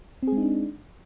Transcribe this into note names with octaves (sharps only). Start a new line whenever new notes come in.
G#3 C4 D4 D#4 G#4